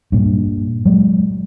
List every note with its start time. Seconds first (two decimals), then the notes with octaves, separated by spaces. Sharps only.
0.12 G2 A#2
0.85 F#3 G#3